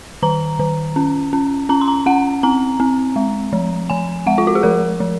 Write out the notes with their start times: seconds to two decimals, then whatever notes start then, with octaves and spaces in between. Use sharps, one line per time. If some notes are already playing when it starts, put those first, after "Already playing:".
0.22 D#3 A#5
0.59 D#3
0.96 C#4
1.33 C#4
1.69 C#4 A#5
1.81 C6
1.88 A#5
2.06 C#4 F#5
2.43 C4 A#5
2.80 C4
3.16 G#3
3.53 F3
3.90 F3 G#5
4.26 G#3 F#5
4.38 F4
4.47 F#4
4.55 G#4
4.63 F3 A#4
5.00 F3